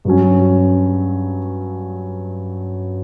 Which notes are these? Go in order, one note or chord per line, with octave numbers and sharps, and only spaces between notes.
G2 F#3 C#4